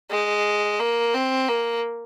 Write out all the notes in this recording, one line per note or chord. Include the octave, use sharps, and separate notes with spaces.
G#3
A#3
C4
A#3